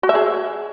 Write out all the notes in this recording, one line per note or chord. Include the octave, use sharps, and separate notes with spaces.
F#4
E5
G#4